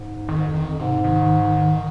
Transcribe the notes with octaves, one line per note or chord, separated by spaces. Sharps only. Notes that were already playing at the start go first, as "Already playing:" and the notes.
Already playing: G#2
F2 D#3
G#2
F2
D#3
F2
G#2 C3
D#3